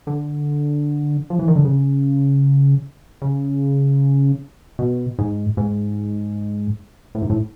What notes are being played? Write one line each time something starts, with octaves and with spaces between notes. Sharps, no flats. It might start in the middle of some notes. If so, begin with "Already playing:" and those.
D3
F3
E3
D#3
D3
C#3
C#3
B2
G#2
G#2
A2
G#2
A2